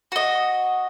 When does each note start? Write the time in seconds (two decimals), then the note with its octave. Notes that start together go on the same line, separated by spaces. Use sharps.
0.12 F#4 D#5